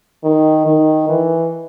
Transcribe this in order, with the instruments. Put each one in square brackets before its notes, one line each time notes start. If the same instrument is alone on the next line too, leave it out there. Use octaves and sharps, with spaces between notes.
[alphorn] D#3
D#3
E3